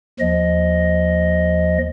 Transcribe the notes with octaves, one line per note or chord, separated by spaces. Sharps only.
D#2 F3 D#5